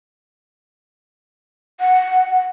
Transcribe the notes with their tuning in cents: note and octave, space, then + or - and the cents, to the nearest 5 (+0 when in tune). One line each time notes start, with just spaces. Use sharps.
F#5 +0